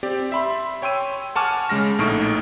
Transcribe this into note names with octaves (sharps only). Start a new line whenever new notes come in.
C4 G4 D5
E5 B5 C6
C#5 G5 C6 E6 D#7
F#5 G#5 A5 C#6 D6 F6
C#3 G#3 F6 A#6
A#1 A2 D#4 C#6 D7